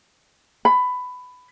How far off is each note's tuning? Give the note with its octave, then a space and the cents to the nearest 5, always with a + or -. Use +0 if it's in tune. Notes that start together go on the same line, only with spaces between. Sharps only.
B5 +15